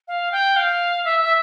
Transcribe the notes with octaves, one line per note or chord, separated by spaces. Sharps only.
F5
G5
F5
E5
E5